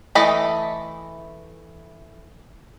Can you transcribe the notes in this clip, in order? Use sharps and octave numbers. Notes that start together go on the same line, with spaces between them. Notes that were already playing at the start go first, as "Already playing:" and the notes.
E3 A3 A4 D#5 B5